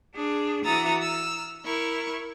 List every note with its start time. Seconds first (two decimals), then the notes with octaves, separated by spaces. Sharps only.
0.15 D4 G#4
0.64 E3 F#4 A#5 D#6 E6 A6
1.01 E6 F6
1.64 E4 A#4 C#6